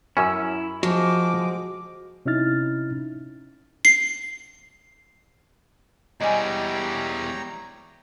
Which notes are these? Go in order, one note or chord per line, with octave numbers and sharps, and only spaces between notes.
F#2 C#4 E4 E6
F3 G#3 F#4 C5 D6
C3 C#4 D#4 E4 F6 A6
C7
E2 G3 G#3 C#5 D#5 G5 G#5 A#5